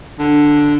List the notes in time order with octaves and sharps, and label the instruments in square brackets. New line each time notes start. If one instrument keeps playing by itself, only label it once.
[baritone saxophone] D3